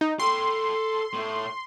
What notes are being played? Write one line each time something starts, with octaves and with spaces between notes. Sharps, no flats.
D#4
A4 G5 C6
A2 A3